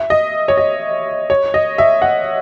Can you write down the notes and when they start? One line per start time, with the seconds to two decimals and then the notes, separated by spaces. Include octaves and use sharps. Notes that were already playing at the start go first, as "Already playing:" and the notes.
Already playing: E5
0.10 D#5
0.48 C#5
0.57 D#5
1.30 C#5
1.54 D#5
1.78 E5
2.02 F#5